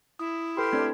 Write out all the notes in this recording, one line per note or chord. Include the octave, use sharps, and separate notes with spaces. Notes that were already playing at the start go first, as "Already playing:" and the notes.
E4 D#6
G4 A4 B4 B5 C6 F6
A3 C4 D4 G#6